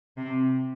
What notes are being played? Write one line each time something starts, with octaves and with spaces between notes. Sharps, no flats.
C3